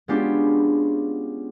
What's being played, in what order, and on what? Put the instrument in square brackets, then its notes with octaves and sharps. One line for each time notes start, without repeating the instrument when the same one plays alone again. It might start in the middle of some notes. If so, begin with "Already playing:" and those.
[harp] G#3 B3 C#4 D4 F4 G4